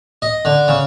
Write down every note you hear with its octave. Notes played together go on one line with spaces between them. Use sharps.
D#5
D3
C#3